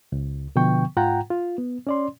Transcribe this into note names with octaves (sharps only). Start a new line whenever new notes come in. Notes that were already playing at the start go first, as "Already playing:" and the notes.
C#2
B2 D3 F3 B3 G5 C#6
G#2 F4 F#5 G5 A#5
F4
B3
C#4 D5 C6